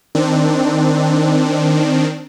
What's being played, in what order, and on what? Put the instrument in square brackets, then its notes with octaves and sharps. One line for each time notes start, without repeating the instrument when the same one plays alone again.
[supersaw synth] D#3 C4 D4